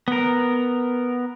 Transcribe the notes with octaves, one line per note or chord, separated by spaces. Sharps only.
B3 A#4